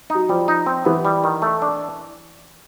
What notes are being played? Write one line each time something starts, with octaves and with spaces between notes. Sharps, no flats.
F#3 D#4
F3 G3
D#4
C4
E3 B3
G3
D#3
A3
D4